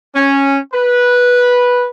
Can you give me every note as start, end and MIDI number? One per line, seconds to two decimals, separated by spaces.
0.15 0.57 61
0.74 1.87 71